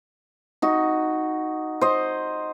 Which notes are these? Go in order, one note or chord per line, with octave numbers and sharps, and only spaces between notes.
D#4 F#4
C5 D#5